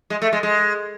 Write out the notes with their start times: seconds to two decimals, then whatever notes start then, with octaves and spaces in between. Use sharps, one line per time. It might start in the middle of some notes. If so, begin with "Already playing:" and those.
0.10 G#3
0.22 A3
0.33 G#3
0.43 G#3